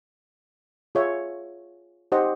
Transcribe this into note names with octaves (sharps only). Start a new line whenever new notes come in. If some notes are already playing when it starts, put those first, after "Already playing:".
F4 G#4 C#5 E5
D#4 G4 C5 D#5 F#5